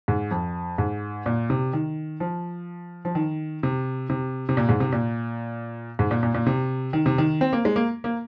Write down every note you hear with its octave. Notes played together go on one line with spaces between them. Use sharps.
G#2
F2
G#2
A#2
C3
D#3
F3
F3
D#3
C3
C3
C3
A#2
G#2
C3
A#2
G#2
A#2
A#2
A#2
C3
D#3
C3
D#3
C4
A#3
G#3
A#3
A#3